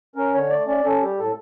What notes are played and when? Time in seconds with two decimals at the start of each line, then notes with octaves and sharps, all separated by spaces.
0.15 C#4 A#4
0.33 D3 C#5
0.49 A3 D5
0.67 C#4 D5
0.84 C#4 A4
1.01 G3 G4
1.18 A2 A4